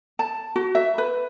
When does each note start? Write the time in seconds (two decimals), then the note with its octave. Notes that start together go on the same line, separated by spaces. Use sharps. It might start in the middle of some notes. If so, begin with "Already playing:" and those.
0.19 A5
0.56 F#4
0.75 E5
0.98 B4